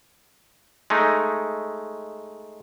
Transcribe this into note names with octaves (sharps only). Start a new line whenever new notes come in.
G#3 A3 D#4